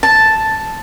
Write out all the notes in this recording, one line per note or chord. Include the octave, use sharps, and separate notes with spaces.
A5